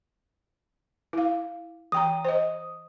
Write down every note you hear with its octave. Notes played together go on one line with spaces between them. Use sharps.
E4 F5
E3 G5 A#5 D#6
C5 D#5